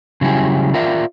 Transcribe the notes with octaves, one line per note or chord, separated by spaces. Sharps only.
C#3 F#3 G3 E4 G#4
F4 A#4 D5 E5